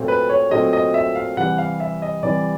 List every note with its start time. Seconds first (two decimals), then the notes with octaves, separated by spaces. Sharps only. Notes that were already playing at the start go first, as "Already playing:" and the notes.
Already playing: A#2 F#3 A3 C4
0.08 B4
0.29 C#5
0.51 A#2 F#3 A3 C4 D#5
0.73 D#5
0.94 E5
1.15 F5
1.37 C3 E3 G3 F#5
1.58 F5
1.80 E5
2.02 D#5
2.23 C3 E3 G3 D5